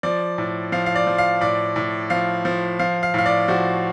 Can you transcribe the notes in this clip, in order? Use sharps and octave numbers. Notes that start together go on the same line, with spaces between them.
F3 D5
A2
F3 F5
F5
D5
F3
F5
A2 D5
A2
F3 F5
F3
F3 F5
F5
A2 F5
D5
F3 F#4